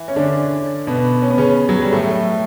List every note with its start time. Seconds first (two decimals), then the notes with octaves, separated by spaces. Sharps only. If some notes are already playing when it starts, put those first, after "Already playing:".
Already playing: E3 E4
0.08 C#4
0.16 D3 D4
0.87 B2 B3
1.22 C#4
1.30 B3
1.38 C#3 C#4
1.69 F#3
1.82 G3
1.93 A2 A3